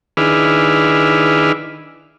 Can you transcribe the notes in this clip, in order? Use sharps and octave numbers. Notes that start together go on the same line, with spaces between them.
D#3 D4 E4 G#4 B4 F6